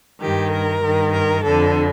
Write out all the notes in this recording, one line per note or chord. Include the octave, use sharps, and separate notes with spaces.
G2 D#3 G4
A#4
G2 D#3
A#4
D3 A4
F2